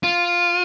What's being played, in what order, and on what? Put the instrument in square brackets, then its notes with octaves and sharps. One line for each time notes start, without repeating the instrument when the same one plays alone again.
[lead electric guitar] F4